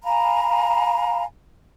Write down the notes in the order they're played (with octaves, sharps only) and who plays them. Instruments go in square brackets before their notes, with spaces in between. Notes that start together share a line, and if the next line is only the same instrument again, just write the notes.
[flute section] F5 G#5 A#5 B5